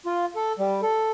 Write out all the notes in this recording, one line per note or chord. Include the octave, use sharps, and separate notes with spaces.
F4
A4
G3
A4